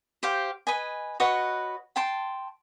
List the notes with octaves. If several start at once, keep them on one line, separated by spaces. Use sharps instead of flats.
G4 C5 F5
B4 D#5 G#5
F#4 B4 C#5 D#5
G5 A5 C6